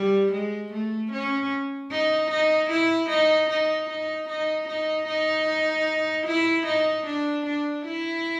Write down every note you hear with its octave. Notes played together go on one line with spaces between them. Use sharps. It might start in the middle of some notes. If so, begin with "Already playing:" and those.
Already playing: G3
G#3
A3
C#4
D#4
D#4
E4
D#4
D#4
D#4
D#4
D#4
D#4
E4
D#4
D4
D4
E4